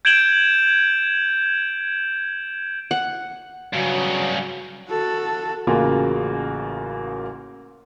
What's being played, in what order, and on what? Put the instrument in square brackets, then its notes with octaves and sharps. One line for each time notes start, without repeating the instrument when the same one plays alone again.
[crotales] G6 G#6 D7 E7 F#7 G7
[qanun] F#5
[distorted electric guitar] G2 C#3 [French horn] F#3
[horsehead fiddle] F#4 A4
[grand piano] A1 C#3 A#3 F4 F#4 G#5